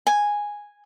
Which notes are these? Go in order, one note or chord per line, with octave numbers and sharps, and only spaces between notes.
G#5